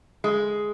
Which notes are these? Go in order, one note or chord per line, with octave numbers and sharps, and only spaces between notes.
G#3